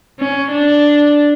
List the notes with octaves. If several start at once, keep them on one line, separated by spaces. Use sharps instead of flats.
C#4
D4